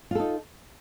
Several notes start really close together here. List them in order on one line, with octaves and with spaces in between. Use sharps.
F4 A4 D#4